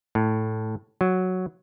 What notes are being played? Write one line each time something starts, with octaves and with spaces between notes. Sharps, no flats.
A2
F#3